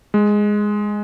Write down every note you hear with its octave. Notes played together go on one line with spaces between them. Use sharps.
G#3